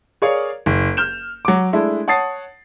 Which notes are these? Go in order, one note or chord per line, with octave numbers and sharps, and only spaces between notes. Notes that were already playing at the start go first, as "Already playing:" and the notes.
G#4 A#4 C#5 D5 F5
F#1
F6 G6 E7
F#3 D6
G#3 A3 D4 E4
C#5 F#5 A5 D#6 A6 C7